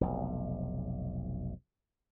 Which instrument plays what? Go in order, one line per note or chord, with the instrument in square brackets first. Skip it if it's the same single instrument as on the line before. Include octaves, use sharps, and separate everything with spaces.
[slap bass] F1 B1